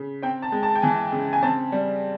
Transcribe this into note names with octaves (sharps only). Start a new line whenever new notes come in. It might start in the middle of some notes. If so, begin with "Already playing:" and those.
Already playing: C#3
C4 G5
A5
G#3
A5
G5
E3 G#5
C#3
G#5
C4 A5
G3